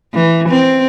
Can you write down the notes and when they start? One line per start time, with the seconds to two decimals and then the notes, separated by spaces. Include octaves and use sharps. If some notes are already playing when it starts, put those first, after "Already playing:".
0.14 E3
0.49 C4